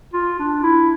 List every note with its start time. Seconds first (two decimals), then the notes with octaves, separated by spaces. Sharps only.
0.14 F4
0.39 D4
0.64 E4